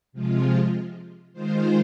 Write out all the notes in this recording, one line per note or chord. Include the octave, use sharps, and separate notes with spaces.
C3 F3 G#3 F4
D#3 G#3 F4 C5